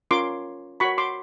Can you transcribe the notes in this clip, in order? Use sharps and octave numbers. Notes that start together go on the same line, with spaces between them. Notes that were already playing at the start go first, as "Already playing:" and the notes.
C#4 F4 A#4 C#5 C6 D6
F#4 A#4 C#5 B5 C#6
C6 D6